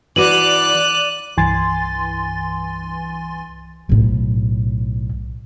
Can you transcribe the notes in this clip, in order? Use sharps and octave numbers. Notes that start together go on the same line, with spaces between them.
E3 F#4 D5 D6 F#6 D#7 F#7
C2 G2 E3 G#5 C6 A6
B1 A2